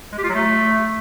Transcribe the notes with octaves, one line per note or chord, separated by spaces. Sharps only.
G#3
G4
F4
F#3
A3